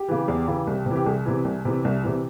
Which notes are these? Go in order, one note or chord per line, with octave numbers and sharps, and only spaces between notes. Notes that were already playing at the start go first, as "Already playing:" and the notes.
Already playing: G4
C#3 E3
E2
C#3 E3
C2
C3 E3
G4
C2 G#4
C3 E3
C2
C3 E3
C2
C3 E3